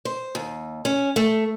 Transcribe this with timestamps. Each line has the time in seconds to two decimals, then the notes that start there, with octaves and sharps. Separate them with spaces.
0.05 C5
0.35 D#2
0.85 C#4
1.16 A3